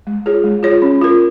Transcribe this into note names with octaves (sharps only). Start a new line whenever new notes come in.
G#3
F4 G#4 C#5
G#3
F4 G#4 C#5
C#4
F4 A#4